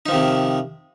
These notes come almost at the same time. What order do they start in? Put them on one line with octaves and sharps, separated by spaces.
D#4 F3 D#3 C3